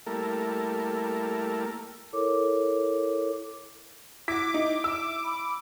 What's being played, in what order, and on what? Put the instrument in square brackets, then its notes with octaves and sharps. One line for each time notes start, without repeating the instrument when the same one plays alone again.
[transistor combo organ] G3 A3 A#3 E4 A4 A#4
[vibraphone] E4 A4 A#4 C#5 D6
[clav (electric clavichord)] E4 [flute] F#4 [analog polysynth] D6 [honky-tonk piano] B6
[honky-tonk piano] D#4 [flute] E5
[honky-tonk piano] E6
[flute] B5